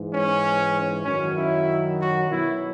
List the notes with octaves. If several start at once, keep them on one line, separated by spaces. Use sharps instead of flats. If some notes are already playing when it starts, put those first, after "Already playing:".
Already playing: G#2 E3
C#4
F#2 D#3 F#3 C#4
E4
F#4
B2 F#3 E4